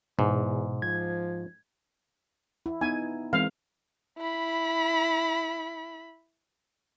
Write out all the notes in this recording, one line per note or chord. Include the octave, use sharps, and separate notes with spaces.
E2 G#2 B2
F3 G#6
E4
B3 D#4 G#5
E3 G#3 C4 F5
E4 B5